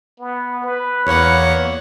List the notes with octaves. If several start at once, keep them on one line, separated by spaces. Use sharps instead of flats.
B3
B4
E2 A#3 C#5 F#5